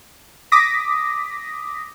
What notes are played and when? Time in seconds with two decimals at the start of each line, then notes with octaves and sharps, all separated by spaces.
0.52 D6 D#6 A#6 B6